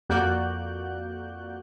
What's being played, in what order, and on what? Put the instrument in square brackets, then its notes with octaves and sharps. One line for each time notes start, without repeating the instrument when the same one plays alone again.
[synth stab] F2 A#3 F#4 D5 F#6 G6